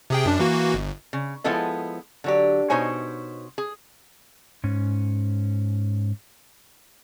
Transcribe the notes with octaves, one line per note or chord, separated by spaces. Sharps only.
C3 G#4 G5
F#2 D4
E3 A#3 F#4
G1
C#3
F3 G#3 B3 E4 A4 D#5
D3 F#3 G4
B2 D#4 C5 C#5 G#5
G#4
G#2 C#4